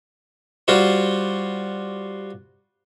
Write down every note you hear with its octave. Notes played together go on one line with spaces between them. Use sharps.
G3 F4 F#4 C5